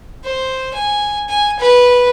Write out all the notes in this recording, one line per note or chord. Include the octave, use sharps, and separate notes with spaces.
C5
G#5
G#5
B4